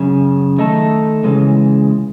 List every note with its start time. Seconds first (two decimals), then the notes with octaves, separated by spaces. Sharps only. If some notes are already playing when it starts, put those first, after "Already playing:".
Already playing: F#2 C#3
0.58 D#3 A3 D#4 A4
1.24 C#3 E3 G#3